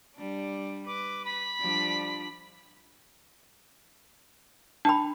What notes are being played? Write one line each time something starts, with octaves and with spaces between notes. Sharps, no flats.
G3 D4
B4 D6
B5
F3 G3 D4
D4 G5 A5 B5